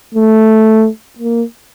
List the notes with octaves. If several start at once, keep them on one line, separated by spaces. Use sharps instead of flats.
A3
A#3